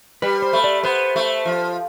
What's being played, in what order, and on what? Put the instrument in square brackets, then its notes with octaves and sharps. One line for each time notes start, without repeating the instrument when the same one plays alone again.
[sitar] G3 [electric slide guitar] B4
[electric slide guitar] C5
[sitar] A3
[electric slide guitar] D5
[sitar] B3 [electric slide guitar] C5
[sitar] A3
F3